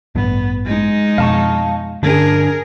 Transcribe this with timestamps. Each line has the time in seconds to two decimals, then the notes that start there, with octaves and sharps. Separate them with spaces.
0.15 A1 G2 B3
0.65 G#3 D#4
1.18 F2 B2 F5 A5 C#6
2.03 G2 D3 C#4 D4 G#4 A#4